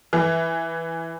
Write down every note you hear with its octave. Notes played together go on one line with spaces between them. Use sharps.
E3